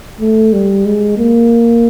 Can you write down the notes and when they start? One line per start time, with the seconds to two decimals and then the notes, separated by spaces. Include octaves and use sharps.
0.20 A3
0.53 G3
0.85 G#3
1.18 A#3